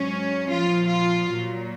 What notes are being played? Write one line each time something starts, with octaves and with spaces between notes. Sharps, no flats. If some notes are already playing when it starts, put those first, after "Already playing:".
Already playing: G#2 F#3 C#4
A#2 F3 F4
F4
A#2 F#3